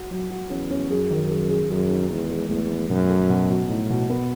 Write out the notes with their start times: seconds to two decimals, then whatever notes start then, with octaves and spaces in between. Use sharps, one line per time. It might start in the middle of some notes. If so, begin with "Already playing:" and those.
Already playing: F#4
0.11 F#3
0.30 F#4
0.50 E2 C#4
0.71 C#4
0.90 F#2 G#4
1.11 D#3
1.30 G#4
1.50 G#4
1.70 F#2 G#4
1.90 D#4
2.10 E2 G#3
2.30 G#3
2.49 E2 A3
2.70 A3
2.89 F#2 B2
3.09 A4
3.29 B2
3.49 B2
3.69 A2 D#4
3.90 B2
4.10 B3